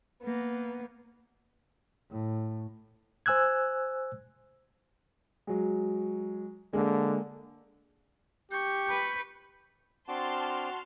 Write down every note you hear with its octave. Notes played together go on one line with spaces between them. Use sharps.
A#3 B3
A2
C5 G#5 E6 F#6 G#6
F#3 G#3
D3 G#3 A#3
G4 C#6 G6
B4
C4 D4 F#4 A5 C6 D6 F6